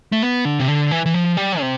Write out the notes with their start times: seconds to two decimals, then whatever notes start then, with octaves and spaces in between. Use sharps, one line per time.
0.12 A3
0.22 B3
0.45 D3
0.60 C3
0.68 D3
0.91 E3
1.06 E3
1.14 F3
1.37 G3
1.60 C3